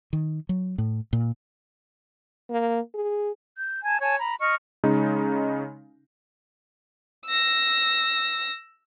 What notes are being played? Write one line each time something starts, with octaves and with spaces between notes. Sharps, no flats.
D#3
F#3
A2
A#2
A#3
G#4
G6
G#5 A5 G#6
C#5 G#5 A5
A#5 B5
D#5 C#6 F6
C#3 G#3 C#4 D#4
E6 A#6